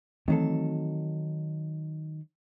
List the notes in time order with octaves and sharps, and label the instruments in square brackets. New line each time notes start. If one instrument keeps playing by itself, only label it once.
[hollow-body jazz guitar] D#3 F#3 A4 [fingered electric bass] E3 A3 C4